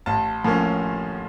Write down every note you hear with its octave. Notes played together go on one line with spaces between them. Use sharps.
A1 A5
A2 F3 A#3 C#4